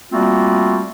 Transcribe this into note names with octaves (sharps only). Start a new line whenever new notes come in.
G3 A3 A#3 C4 F4 F#4